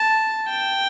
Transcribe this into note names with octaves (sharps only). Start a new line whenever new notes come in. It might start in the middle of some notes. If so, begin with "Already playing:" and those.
Already playing: A5
G5